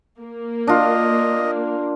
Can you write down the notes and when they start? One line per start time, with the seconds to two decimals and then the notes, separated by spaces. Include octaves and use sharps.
0.21 A#3
0.67 D4 F4 D#5